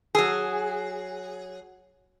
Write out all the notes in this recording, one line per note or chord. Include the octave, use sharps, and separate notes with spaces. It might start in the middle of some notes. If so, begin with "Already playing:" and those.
F#3 G#4